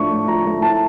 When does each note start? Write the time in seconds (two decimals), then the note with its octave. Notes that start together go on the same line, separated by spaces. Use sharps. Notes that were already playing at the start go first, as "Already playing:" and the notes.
Already playing: A2 F3 A3 D4 C#6
0.11 A2
0.28 F3 A#5
0.46 A3
0.62 E4 A5